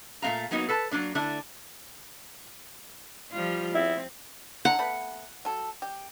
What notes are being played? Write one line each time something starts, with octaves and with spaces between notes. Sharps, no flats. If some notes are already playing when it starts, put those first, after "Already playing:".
A#2 A3 C4 F5 A#5
F#3 A#3 B3 D#4 F#4 C#5
A4 B4 A5
F#3 A#3 D4 D5
D3 A3 D4 E4
F3 G3 F4
C4 E4
D3 E4 F#5 A#5
A3 B3 B5
F#3 A4
G4